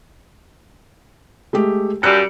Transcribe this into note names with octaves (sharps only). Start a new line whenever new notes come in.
G#3 A3 G4
F#2 G3 E6 F#6 C#7